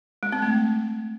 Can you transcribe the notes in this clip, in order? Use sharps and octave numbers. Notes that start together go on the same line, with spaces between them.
G#3
C4
A3